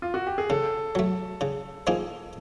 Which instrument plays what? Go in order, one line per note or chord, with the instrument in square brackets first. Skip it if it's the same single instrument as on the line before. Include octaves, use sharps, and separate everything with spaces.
[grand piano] F4
F#4
G4
G#4
[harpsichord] C#3 [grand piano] A4
[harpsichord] F#3 A3
C#3
F3 A#3 D#4 G#4